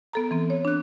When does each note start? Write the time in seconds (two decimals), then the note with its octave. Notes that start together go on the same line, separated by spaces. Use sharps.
0.13 B3 A4 A#5
0.31 E3 C4
0.50 C#5
0.65 D4 F#6